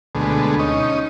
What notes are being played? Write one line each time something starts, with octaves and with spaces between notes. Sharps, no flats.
D2 B2 G#3 A3
C#4 D#4